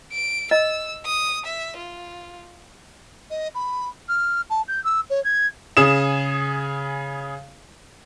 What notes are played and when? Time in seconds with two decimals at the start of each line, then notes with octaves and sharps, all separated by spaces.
0.12 D7
0.51 D#5 E6
1.06 D#6
1.46 E5
1.77 F4
3.30 D#5
3.55 B5
4.08 F6
4.50 A5
4.68 G6
4.84 E6
5.10 C#5
5.24 G#6
5.77 C#3 G#4 D#6 E7